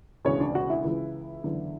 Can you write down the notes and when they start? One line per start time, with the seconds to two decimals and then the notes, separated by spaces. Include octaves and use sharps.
0.25 E1 D2 C#3 E3 C#4 C#5
0.40 D4 D5
0.55 F#4 F#5
0.70 E4 E5
0.84 C#2 C#3 E3
1.44 F#1 E2 D3